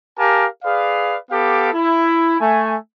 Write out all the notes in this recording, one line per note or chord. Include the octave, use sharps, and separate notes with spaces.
G4 A#4 F5 G#5 A5
G#4 B4 D5 F5
B3 G4 A4 F5 D6
E4
A3 G#5